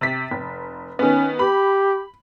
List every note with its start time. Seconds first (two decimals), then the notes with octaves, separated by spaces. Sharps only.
0.01 C3 A6 B6
0.31 F1
0.99 D#3 B3 C#4
1.39 G4 B5